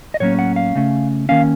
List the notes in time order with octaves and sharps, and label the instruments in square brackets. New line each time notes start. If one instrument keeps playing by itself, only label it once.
[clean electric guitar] D#5
A2 F#3 A#3 C#4 C#5
F#5
F5
C#3 A3 C#4
D#3 A#3 C#4 F5